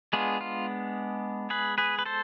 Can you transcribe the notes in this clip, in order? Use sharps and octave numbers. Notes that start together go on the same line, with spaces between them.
G#3 B3 D4 F4 G#4
F4
G#4 B4
G#4 B4
B4
A4 C5